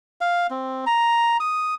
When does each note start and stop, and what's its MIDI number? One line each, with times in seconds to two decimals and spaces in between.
0.21 0.47 77
0.50 0.85 60
0.86 1.37 82
1.40 1.75 87